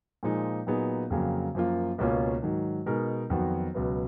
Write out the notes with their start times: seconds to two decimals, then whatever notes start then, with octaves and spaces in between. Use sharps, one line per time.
0.23 A#2 F3 G#3 D#4
0.67 A#2 F#3 B3 D#4 G#4
1.10 F2 C#3 F#3 A#3
1.55 F#2 F3 A#3 F4
1.98 C#2 B2 A#3 C#4 F4
2.42 G#2 D#3 F#3
2.86 B2 G#3 D#4 A#4
3.30 F2 D#3 F#3 B3 F#4
3.74 C#2 B2 F#3 B3